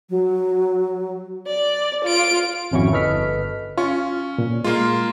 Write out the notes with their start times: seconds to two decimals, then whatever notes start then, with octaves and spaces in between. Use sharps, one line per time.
0.10 F#3
1.47 D5
2.04 F4 D7
2.71 G#1 F2 C#4 E4 F#4 C#6
2.92 G1 A4 B4 D#5 F6 B6
3.78 C#4 F4 C#6
4.38 A#2
4.64 G#3 A#3 F4 C6